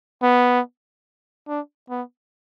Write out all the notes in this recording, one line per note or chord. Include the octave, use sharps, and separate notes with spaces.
B3
D4
B3